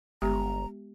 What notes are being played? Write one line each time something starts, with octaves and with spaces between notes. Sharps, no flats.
G1 G#3 B3 G4 A#5